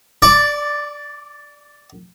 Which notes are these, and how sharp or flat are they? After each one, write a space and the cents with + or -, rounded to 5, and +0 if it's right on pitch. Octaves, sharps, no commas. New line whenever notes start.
D5 +0 D6 -35